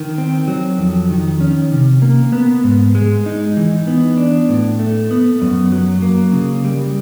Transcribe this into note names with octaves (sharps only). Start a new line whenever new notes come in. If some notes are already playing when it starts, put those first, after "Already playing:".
Already playing: D#3
C4
F#3
F2
D#3
C#4
C3
A#3
B3
G#2
G#3
D#4
E3
B3
D4
A2
A3
B3
F#2
F#3
A#3
C#3
G3